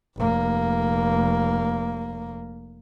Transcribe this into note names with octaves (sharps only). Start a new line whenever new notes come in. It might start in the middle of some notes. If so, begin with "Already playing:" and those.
F1 A#3